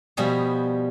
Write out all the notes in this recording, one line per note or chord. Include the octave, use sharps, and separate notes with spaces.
B2 F3 G3 B3 G#4